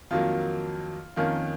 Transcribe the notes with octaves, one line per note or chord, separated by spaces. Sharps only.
F2 D#3 F#3 A#3 F4
F2 D#3 A#3 C#4 F4